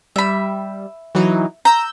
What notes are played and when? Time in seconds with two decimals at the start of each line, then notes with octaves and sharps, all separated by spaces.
0.16 G3 E5 B5
1.15 E3 F#3 D#4
1.65 A#5 E6 G6